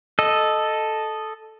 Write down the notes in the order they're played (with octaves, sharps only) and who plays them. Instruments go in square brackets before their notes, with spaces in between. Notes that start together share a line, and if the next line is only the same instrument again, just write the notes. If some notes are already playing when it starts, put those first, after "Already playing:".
[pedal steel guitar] A4 D#5